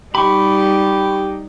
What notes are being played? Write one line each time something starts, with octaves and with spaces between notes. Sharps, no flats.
G3 D#4 G4 B5 C#6